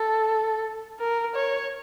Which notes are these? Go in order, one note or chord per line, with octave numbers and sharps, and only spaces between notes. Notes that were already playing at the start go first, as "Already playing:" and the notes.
Already playing: A4
A#4
C#5